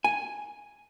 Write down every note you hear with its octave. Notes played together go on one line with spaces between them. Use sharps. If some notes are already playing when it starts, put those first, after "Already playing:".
G#5